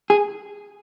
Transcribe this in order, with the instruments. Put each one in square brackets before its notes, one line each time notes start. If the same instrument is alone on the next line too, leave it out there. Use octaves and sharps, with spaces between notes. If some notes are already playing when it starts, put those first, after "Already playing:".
[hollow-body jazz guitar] G#4